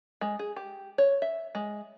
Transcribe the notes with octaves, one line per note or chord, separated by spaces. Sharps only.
G#3
G#4
G4
C#5
E5
G#3